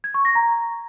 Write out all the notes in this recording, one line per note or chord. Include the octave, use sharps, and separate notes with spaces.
G#6
C#6
A#6
A#5